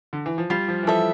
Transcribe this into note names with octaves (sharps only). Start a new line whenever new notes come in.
D3
E3
F3
G3 F4
F3
E3
F3 A4 E5